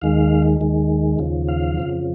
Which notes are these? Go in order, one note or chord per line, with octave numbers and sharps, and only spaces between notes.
D#2 D#3 G#3 F5
D#2 D#3 G#3
D#2 C#3 F3
F5
F2 C#3 F3